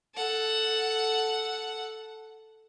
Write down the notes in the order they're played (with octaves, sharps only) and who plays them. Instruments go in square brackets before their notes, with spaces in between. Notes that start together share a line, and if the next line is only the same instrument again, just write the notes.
[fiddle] A4 F#5